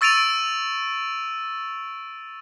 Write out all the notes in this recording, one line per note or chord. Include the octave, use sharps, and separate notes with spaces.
C#6 E6 A6 D7 D#7 F7